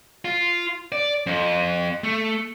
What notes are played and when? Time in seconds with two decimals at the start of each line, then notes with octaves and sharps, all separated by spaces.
0.25 F4
0.92 D5
1.26 F2
2.03 A3